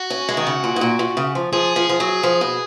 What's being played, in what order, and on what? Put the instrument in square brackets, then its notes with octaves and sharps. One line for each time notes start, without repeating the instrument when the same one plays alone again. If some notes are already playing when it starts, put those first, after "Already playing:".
Already playing: [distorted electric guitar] F#4
[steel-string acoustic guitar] C#4
G#3
D#3
C#3
A#2
G#2
A#2
A#2
C#3
F3
[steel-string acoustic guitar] F3 [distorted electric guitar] G#4
[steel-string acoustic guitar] F3
F3
F#3
F3
B2